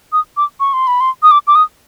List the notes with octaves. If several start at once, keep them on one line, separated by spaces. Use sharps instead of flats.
D#6
D6
C#6
C6
B5
C6
D#6
D6
D6
D#6